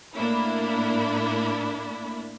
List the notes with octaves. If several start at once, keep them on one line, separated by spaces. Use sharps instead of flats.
A2 A#3 D4 E4 B5